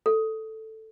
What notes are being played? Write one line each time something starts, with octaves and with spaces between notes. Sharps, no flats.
A4